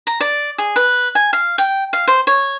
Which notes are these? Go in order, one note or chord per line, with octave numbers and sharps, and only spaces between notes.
A#5
D5
G#4
B4
G#5
F5
G5
F5
C5
C#5